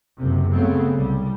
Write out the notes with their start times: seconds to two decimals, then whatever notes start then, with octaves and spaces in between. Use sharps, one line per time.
0.19 F#1 C3
0.52 C#3 F#3 A3 B3 C4
0.93 C2 G3